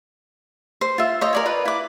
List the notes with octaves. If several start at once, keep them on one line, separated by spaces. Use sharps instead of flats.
C5
F4 E5
C5 C#5 D#5
A#4 D5 G#5
F4 B4
E4 D6